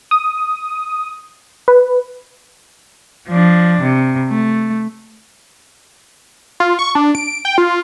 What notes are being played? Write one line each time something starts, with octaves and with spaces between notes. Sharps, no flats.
D#6
B4
F3 D4
C3
A3
F4
C#6
D4
D7
G5
F4